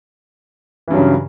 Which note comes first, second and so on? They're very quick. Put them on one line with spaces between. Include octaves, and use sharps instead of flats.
E3 G2 F#3 C#3